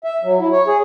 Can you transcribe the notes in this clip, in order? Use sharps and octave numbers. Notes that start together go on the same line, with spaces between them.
E5
F#3
E4
C#5
G#4